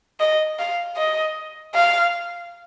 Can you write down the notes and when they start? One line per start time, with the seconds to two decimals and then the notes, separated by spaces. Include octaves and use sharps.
0.20 D#5
0.59 F5
0.97 D#5
1.75 F5